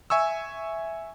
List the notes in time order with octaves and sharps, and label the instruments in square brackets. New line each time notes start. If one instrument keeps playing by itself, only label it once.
[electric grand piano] E5 G#5 C#6 E6